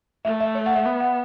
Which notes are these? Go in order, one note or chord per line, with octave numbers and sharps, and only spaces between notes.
A3 E5
E5
C#5
F#5
E5
B3 E5
F#5